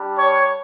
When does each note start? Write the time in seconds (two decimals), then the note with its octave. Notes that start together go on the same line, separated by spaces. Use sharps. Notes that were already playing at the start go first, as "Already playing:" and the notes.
Already playing: G3 D4 G4
0.18 C#5